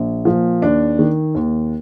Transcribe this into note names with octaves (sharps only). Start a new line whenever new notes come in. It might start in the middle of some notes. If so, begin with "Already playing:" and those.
Already playing: A#1
A#2 F3
D#2 D4
D#3
D#2